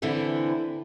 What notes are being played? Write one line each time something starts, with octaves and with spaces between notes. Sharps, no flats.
D3 E3 C4 E4 B4